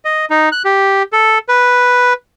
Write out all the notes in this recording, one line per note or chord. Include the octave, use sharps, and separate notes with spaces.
D#5
D#4
F#6
G4
A4
B4